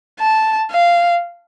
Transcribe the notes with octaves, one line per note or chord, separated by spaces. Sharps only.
A5
F5